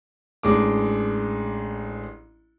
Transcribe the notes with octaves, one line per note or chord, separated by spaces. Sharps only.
A1 G#3 D4 D6